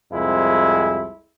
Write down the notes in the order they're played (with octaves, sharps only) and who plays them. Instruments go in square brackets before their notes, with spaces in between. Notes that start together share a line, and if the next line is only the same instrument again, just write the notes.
[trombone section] C2 F2 G#3 E4